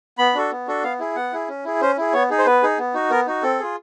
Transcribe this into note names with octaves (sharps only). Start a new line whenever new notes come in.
B3 B5
D4 F#4 A4
B3
D4 F#4 A4
B3 F5
E4 G#4
B3 F#5
E4 G#4
C#4
E4 G#4
C#4 C5
E4 G#4
B3 C#5
D#4 G#4
C5
B3 B4
D#4 G#4
B3
D#4 F#4
B3 A#4
D#4 F#4
C4 A4
F4 G#4